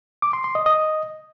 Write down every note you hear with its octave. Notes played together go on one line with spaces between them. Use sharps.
D6
C6
C6
D#5
D#5